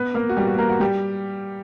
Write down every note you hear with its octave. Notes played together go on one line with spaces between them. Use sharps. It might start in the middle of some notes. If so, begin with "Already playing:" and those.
Already playing: B3 B4
A#3 A#4
F#4
G3 G4
F#4
A#3 A#4
F#4
G3 G4